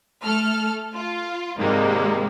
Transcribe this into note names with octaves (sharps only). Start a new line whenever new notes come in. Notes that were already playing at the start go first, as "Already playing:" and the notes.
A3 A4 F6
F4
G#2 C3 D#3 G3 G#3 A#3